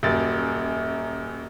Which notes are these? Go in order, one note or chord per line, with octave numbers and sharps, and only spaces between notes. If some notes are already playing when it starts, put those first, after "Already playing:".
D#1 F#2 A6